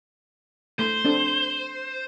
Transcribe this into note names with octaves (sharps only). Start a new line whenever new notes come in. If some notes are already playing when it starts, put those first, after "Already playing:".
A3 C5 G7
C4 D4 A4